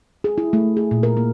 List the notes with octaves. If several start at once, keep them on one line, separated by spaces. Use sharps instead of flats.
G#4
E4
A3
G#4
A#2
A#4
A#3